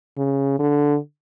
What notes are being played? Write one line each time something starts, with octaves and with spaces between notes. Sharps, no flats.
C#3
D3